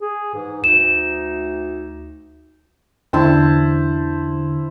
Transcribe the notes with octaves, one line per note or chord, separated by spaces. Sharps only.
G#4
G#2 E3
D2 D#4 E7
E2 D3 E4 C5 A5